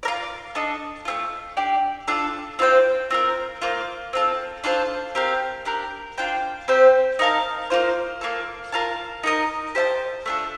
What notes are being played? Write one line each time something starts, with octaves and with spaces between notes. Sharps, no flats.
F4 A#4 D5
D4 A4 D#5
A3 C4 F4
D4 G4 D5
D4 F4 A4
C4 F4 C5 G5
C4 F4 A#4
A#3 F4 C5
C4 F4 A4
D4 F4 A4 C5
C4 G4 A#4 F5
D4 G4 A#4
D4 F4 C5 G5
C4 G4 C5 G5
D#4 A#4 F5 A5
A#3 F4 C5
A#3 F4 A4
F4 A#4 F5 A5
D#4 A#4 D#5
G4 C5 F5 A5
A3 D4 F4 A4